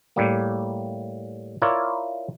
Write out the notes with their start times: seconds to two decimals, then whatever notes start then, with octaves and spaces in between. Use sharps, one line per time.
0.16 A2 G3 A#3
1.62 E4 F4 A#4 C#5 D5